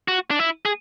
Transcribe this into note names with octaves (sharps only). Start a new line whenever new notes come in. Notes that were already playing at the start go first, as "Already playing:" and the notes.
F#4
D4
E4
G#4